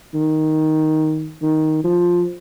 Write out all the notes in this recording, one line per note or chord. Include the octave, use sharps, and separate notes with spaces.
D#3
D#3
F3